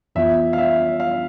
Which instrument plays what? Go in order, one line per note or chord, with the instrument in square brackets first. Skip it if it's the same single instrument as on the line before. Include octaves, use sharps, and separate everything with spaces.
[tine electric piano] F2 E3 B3 F4 [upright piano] E5
[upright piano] F5
E5
F5